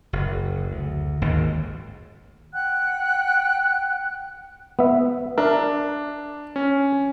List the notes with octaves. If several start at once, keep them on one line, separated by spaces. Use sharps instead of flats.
F#1
D2
G#1 D#2 G#2
F#5 G5 F#6
B3 E5
D4 A#4 E5
C#4